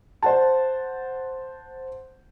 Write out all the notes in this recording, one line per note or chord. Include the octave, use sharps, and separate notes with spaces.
C5 F#5 A5